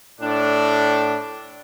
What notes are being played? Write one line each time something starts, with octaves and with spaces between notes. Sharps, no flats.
A2 D4